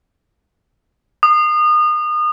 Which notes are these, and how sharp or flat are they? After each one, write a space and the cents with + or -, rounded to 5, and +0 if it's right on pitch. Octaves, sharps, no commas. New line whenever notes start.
D#6 -30